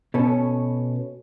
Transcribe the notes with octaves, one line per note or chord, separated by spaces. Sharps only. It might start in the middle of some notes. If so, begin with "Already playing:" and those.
B2 B3 C#4 A4